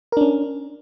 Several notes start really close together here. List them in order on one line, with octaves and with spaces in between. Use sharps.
A#4 D4 C#4